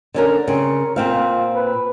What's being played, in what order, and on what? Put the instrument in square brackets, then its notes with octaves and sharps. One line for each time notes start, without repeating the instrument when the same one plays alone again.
[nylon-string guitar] D3 C#4 A#4
[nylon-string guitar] C#3 C4 [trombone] A#4
[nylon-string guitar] A#2 C4 F5 [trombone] F4
[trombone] B4